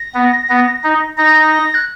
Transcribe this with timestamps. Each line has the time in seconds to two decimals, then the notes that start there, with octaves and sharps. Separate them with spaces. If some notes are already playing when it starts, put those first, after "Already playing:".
Already playing: A#6
0.15 B3
0.50 B3
0.84 D#4
1.17 D#4 A#6
1.52 A#6
1.74 F#6